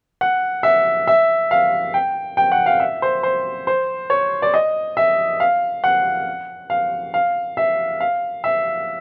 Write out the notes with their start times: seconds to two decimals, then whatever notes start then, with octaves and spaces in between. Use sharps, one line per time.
0.21 F#5
0.63 E5
1.07 E5
1.51 F5
1.94 G5
2.37 G5
2.52 F#5
2.66 F5
2.80 E5
3.02 C5
3.23 C5
3.67 C5
4.10 C#5
4.42 D5
4.54 D#5
4.97 E5
5.40 F5
5.84 F#5
6.70 F5
7.14 F5
7.57 E5
8.00 F5
8.44 E5